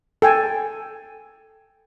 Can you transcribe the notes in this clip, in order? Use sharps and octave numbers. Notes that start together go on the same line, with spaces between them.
A4 G5 G#5